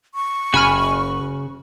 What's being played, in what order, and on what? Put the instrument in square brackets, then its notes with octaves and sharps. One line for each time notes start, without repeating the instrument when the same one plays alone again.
[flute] C#6
[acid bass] F#1 [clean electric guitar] C#3 F#4 [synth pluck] G#5 B5 F6